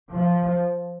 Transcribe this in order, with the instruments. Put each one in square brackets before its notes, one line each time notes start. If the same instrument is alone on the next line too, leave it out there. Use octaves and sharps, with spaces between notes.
[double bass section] F3